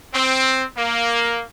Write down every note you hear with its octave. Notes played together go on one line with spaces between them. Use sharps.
C4
A#3